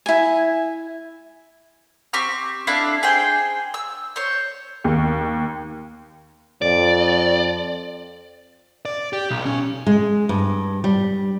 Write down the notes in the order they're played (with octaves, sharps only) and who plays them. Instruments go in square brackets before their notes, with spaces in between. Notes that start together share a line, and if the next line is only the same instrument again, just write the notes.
[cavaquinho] E4 G#5
[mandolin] C4 G4 C#6 F6
D4 E4 A4 F5
G#4 C5 G5
E6
C5 C#5
[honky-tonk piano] D#2
[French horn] F2 [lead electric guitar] D5
[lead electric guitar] D5
G4
B1
C#4
[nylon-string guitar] G#3
G2
G3